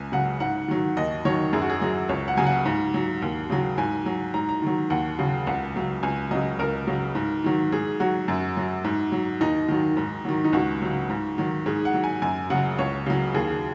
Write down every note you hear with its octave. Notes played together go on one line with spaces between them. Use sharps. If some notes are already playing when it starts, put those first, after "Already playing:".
Already playing: C#2 G#5
C#3 F#3 F#5
G#2 F#5
D#3 F#3
D#2 D#5
D#3 F#3 C#5
F#2 G#4
F#4
G#4
F#3
C#2 C#5
F#5
C#3 F#3 G#5
F#5
G#2
F#3
D#2
C#3 F#3
G#2 G#5
F#3
G#2 A#5
A#5
D#3 F#3
D#2 F#5
C#3 F#3
C#2 F#5
C#3 F#3
C#2 G#5
C#3 F#3 D#5
C#2 A#4
C#3 F#3
G#2
D#3 F#3
G#2 G#4
F#3 F#4
F#2
F#3
G#2
F#3
D#2 D#4
D#3 F#3
G#2
D#3 F#3
D#4
C#2 F#4
C#3 F#3
G#2
D#3 F#3
G#2 G#4
F#5
F#3
G#5
F#2 G#5
C#3 F#3 F#5
C#2 C#5
C#3 F#3
D#2 G#4